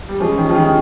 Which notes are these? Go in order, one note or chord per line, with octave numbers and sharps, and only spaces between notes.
G3
F3 G#3 C#4 G#4
D#3
F3
D#3